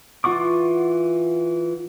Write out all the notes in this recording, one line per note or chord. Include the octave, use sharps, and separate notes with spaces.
E3 F4 F#5 C#6 D6